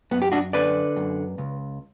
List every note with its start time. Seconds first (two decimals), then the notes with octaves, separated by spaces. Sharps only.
0.11 F#2 B3
0.22 G4
0.32 D4 F#4
0.53 D3 B4 D5
0.96 F#2
1.38 C#2